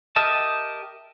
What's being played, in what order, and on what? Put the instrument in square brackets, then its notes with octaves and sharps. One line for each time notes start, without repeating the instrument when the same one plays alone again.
[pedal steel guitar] G4 A#4 D#5 E5 A5